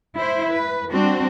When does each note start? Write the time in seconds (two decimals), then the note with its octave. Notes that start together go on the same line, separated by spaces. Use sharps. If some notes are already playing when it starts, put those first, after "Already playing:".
0.17 E4 C5
0.53 B4
0.91 G3 C4 D4 F#4